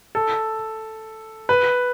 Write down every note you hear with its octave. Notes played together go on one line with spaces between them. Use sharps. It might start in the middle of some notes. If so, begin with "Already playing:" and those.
A4
B4